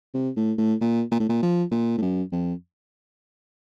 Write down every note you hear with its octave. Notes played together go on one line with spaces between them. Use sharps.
C3
A2
A2
A#2
A#2
A2
A#2
F3
A#2
A2
F#2
F2